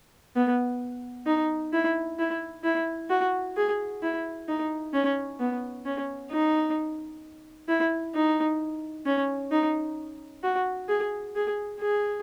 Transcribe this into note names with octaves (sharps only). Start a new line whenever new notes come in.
B3
D#4
E4
E4
E4
F#4
G#4
E4
D#4
C#4
B3
C#4
D#4
E4
D#4
C#4
D#4
F#4
G#4
G#4
G#4